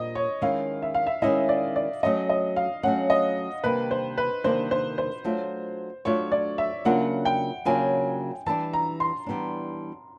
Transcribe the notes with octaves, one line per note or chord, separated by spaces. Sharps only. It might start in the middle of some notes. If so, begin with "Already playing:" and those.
Already playing: A#2 G3 C4 D#5
C#5
D#3 G#3 C#4 E4 F5
E5
F5
E5
D#3 G#3 C#4 E4 D#5
D5
D5
F#3 A3 C#4 D#5
D#5
F5
F#3 A3 C#4 F#5
D#5
C3 D#3 G3 A#3 D4 B4
C5
B4
C3 D#3 G3 A#3 D4 C5
C5
C5
F#3 A3 D4 F4
F#3 A3 D4 F4 C#5
D5
E5
C#3 F#3 A#3 D4 F4 F#5
G5
C#3 F#3 A#3 D4 F4 G#5
E3 G3 B3 D4 A5
A#5
C6
E3 G3 B3 D4